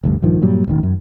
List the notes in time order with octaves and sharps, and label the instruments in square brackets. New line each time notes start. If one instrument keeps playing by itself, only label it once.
[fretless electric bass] F1 D2 G2
A#1 G2 D#3 F3
G2 A#2 F#3 G3
E1 A1 D#3
F#2